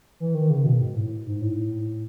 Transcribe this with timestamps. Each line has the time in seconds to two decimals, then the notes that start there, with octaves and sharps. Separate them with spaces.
0.20 E3
0.35 D#3
0.50 C#3
0.65 B2
0.81 G#2
0.95 A2
1.26 G#2
1.41 A2
1.56 A2